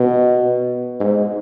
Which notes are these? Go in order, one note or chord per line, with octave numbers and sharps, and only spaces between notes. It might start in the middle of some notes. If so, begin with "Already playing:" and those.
Already playing: B2
G#2